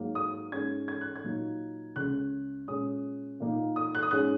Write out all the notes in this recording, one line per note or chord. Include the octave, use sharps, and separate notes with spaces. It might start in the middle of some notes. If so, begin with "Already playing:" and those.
Already playing: G#2 F#3 A#3
D#6
G#2 G#3 C#4 G#6
G#6
F#6
G#6
A#2 F#3 A#3 D#4
C#2 C#3 G#3 C#4 F#6
A#2 G#3 C#4 D#6
A#2 A#3 D#4
D#6
F#6
D#6
G#2 G#3 C#4 F#6